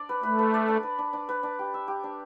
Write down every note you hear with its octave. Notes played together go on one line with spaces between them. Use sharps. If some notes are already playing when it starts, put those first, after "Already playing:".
Already playing: D4 D5
B4
A3 B4
B4
D5
D4
B4
D4
D4
B4
D4
G4
E5
G4
D4